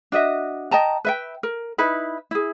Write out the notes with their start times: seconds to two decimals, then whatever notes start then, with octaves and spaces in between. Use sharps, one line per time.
0.12 D4 F#4 D#5 E5
0.71 D#5 G5 A5 A#5
1.05 B4 E5 G5
1.43 A#4
1.78 D#4 E4 B4 B5
2.31 E4 G#4